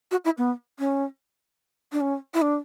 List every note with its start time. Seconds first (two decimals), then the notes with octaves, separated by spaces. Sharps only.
0.11 F#4
0.25 E4
0.38 B3
0.79 C#4
1.92 D4
2.01 C#4
2.34 E4
2.42 D4